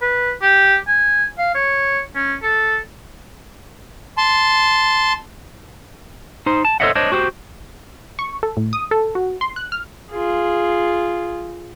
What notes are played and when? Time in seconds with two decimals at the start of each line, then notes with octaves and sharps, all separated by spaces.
0.01 B4
0.42 G4
0.88 G#5
1.38 F5
1.54 C#5
2.15 C#4
2.43 A4
4.18 A5 C6
6.46 D#4 C5
6.65 A5
6.80 A4 C5 C#5 D#5 E5 F#5
6.95 D4 C5 C#5 D#5
7.12 F#4 G4 C5
8.19 C#6
8.43 A4
8.57 A2
8.73 D#6
8.91 A4
9.15 F#4
9.41 C6
9.56 F#6
9.72 F6
10.11 F4 G#4